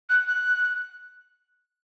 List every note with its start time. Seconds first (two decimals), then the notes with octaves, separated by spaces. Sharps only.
0.09 F#6
0.28 F#6